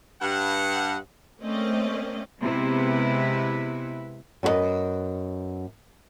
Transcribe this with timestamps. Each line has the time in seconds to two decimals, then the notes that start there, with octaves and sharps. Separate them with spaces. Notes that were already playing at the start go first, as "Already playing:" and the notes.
0.22 G2 F#5
1.41 A3 A#3 C4 C#4 D5 D#5
2.41 C3 G#3 B3 E4 B4
4.43 F#2 B3 F#4 B4 D#5